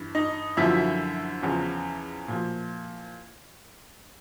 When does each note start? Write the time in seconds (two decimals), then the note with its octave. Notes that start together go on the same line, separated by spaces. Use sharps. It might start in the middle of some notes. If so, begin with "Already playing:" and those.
Already playing: G2 E3
0.15 D#4 D#5
0.57 F#2 D3 F3 E4 E5
1.42 E2 C#3 F3
2.28 A#2 F3